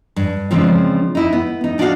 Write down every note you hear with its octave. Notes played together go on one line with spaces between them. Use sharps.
G2
C#3 F3 G#3 C4 D4
D#4 E4
B3
D#4
D4 D#4 F#4 B4 F5